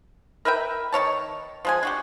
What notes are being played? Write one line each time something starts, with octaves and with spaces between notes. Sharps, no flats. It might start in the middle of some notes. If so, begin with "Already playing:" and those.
A#4 B4 E5 G5
D#3 E4 C#5 A5
F3 G#3 G#5
D4 F#4 G4